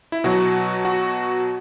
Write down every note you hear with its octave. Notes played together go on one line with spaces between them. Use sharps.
E4
B2 F#3 F#4
F#4